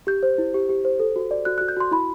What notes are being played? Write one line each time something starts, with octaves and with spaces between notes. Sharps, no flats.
G4 G6
C5
E4
G4
G4
C5
A4
F#4
D5
F#4 F#6
F#4 F#6
G6
F#4 C6
E4 B5